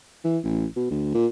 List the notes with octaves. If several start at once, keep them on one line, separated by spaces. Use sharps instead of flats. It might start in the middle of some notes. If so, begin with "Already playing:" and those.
E3
A1
B2
D2
A#2